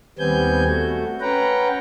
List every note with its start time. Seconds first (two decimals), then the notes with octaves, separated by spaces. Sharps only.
0.19 D#2 G3 B3 C4 G#5 G6
0.66 A3 F#4
1.21 C#4 B4 F#5 G5 A#5